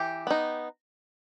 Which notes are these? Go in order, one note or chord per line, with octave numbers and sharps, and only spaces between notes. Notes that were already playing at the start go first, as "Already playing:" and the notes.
Already playing: E3 G4
B3 D#4